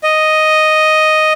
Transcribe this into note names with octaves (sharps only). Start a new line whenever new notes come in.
D#5